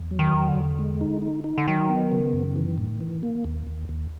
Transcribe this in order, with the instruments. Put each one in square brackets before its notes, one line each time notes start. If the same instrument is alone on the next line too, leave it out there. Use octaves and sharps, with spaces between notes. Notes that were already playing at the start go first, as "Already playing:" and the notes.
Already playing: [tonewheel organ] E2
F#3
[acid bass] D#3
[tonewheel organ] E2
[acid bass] D3
[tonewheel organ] E2
G#3
D#4
D#4
D#4
[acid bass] D3
[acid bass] D#3 [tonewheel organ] F#3
[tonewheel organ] B3
C#3
F#2
E3
A2
E3
A#3
D#2
D#2
D#2